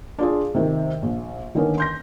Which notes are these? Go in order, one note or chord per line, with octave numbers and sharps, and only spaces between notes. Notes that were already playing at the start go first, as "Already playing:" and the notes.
D4 F4 G#4
C3 D#3
A#1
D3 D#3 A#3 B3 C#4
C6 G6 A#6